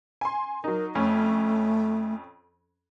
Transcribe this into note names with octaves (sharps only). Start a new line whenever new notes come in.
G#5 C6
F#3 D#4 A#4
F2 A3 C#4